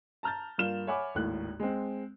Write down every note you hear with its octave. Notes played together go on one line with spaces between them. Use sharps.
A5 A#5 F6 G6 A6
G2 A#3 F4 F6 E7 G7
C#5 E5 F#5 G#5 B5 D6
G#1 D#2 A2 F#6
G#3 C4